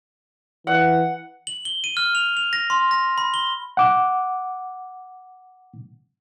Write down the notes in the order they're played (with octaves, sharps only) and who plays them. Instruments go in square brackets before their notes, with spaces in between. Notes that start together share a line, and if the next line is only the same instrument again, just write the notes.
[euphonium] E3 [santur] F#5
[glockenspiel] F#7
G7
D#7
F6
F7
F7
A#6
C6
A#6
B5
G7
[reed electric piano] F#5 D6